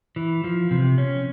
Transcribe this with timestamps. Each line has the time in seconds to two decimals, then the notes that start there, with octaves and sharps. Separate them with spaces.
0.16 E3
0.44 F3
0.71 C3
0.98 C#4